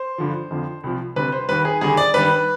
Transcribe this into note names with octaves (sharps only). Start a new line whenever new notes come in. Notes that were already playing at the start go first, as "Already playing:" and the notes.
Already playing: C5
G2 D3 F3
F2 D3 F3
C2 C3 F3
D2 C3 G3 B4
C5
D#2 D#3 G3 B4
G#4
D#2 D3 G3 G#4
D5
G2 D#3 G3 B4